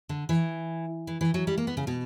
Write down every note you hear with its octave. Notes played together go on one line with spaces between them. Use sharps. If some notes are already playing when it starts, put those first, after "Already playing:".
D3
E3
E3
E3
F#3
G3
A#3
B3
C#3
B2